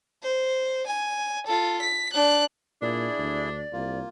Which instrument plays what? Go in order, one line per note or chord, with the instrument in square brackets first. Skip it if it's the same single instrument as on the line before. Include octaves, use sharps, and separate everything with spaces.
[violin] C5
G#5
F4 A4
B6
D4 F#6
[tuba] A#2 [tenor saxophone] D4 [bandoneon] E4 G#4 [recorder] D5
[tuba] D2
[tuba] C2 [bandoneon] A#3 F4